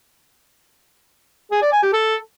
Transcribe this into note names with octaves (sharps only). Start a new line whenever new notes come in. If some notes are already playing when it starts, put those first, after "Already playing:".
G#4
D5
G#5
G4
A4